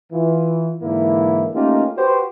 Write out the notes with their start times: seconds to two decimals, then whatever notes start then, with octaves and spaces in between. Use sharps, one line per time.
0.12 E3 F4
0.83 G#2 D3 E3 A#3 E4
1.54 A3 A#3 C#4 D#4 F4 G4
1.97 F#4 G4 B4 C5